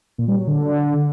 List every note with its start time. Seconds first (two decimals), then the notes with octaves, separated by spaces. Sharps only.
0.18 A#2
0.28 G3
0.38 F#3
0.47 D3